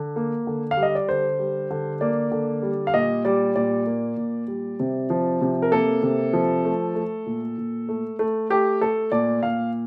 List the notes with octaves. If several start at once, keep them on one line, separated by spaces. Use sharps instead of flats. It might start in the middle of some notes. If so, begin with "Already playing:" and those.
Already playing: D3
A#3
D3
F5
G3
D#5
D5
D3 C5
G3
D3
A#3 D5
D3
G3
F5
A#2 D#5
G3 D5
A#2 D5
A#3
A#2
G3
C3
F3
C3
A#4
A#3 A4
C3
F3
A3
A3
A#2
A#2
A3
A3
A3 G4
A3 A4
A#2 D5
A#2 F5